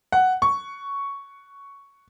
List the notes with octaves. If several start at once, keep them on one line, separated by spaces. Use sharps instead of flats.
F#5
C#6